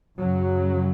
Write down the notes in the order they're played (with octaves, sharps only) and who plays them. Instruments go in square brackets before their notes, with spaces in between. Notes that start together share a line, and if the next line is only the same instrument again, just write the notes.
[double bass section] F#2 C#3 F#3